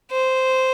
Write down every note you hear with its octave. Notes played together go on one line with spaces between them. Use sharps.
C5